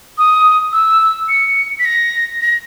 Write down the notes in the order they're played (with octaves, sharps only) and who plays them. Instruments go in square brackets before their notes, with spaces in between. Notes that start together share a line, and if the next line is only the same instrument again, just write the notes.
[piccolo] D#6
E6
C#7
B6
A#6
A#6